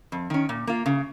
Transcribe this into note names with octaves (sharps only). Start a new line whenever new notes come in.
F2
D#3 C#4
A#2
A#3 F4
C#3